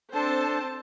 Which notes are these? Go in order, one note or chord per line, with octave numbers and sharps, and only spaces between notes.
C4 D4 A4 C5 A5